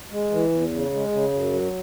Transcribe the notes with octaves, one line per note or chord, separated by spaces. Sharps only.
G#3
E3
E2
C#3
G#3
C#3
F#2
F#3